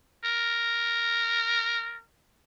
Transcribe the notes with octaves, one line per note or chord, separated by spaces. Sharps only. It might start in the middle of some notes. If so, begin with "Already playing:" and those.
A#4